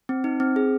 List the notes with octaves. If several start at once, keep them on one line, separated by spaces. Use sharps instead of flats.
C4
D#4
C4
G#4